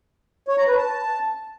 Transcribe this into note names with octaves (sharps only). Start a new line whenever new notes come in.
C#5
A#5
B4
A5